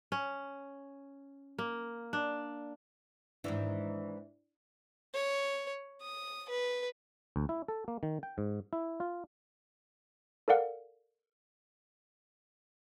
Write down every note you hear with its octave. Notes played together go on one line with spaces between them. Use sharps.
C#4
A#3
D4
G#2 D#3 E3 D4 E4 D5
C#5
D#6
B4
D2
E4
A4
A#3
D#3
G5
G#2
E4
F4
A4 A#4 D5 F5 F#5